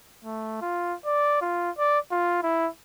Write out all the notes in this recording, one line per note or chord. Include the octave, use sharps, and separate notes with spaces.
A3
F4
D5
F4
D5
F4
E4